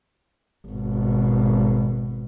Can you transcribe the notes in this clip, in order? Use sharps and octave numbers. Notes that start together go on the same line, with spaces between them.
G#1 B2